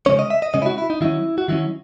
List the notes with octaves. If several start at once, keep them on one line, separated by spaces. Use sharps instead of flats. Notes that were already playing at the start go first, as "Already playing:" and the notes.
C#3 G#3 C#4 C#5
D#5
E5
D#5
C#3 G#3 C#4 D#5
E4
F#4
E4
D#4
D#3 F#3 C#4 E4
F#4
D#3 F#3 C#4 E4